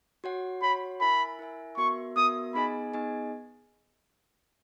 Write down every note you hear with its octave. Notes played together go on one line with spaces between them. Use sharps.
F#4 C#5 F#5
F#4 C#5 F#5 B5
E4 A#4 E5 G#5 B5
E4 A#4 E5 G#5
B3 F#4 A#4 E5 C#6
B3 F#4 A#4 E5 D#6
B3 D#4 G#4 D#5 G#5 B5
B3 D#4 G#4 D#5 G#5